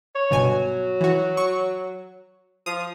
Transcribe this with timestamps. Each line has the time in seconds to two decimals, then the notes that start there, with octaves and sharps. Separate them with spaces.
0.15 C#5
0.30 G1 B2 G#5
0.44 F#3
1.01 E3 F#4
1.37 C#6
2.66 F3 D#6